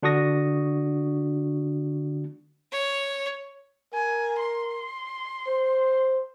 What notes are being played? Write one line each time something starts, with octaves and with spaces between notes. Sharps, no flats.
D3 D4 F#4 C#6 D#6 A#6
C#5
A#4 G#5
C6
C5